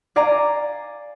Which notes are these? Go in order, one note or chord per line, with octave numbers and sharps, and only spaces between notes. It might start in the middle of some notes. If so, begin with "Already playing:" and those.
D5 F5 G#5 A#5